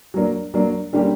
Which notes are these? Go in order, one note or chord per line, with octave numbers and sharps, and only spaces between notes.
F#3 A#3 D4
F#3 A#3 D4
D3 G3 A#3 C#4 G4